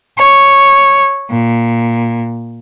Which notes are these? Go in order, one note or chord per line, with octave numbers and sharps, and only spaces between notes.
C#5
A#2